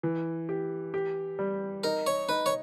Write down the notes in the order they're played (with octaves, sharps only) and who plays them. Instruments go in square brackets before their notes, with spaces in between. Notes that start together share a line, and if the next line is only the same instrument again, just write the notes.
[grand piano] E3
G4
G4
G3
[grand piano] D#4 [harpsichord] A#4
[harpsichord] C#5
[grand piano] D#4 [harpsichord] B4
[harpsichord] C#5